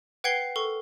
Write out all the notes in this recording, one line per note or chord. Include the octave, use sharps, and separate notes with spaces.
B4 F#5 G5 G#6 C7 G7
A4 A#4 C#6